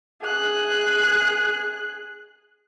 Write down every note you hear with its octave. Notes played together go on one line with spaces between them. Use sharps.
G#4 F#6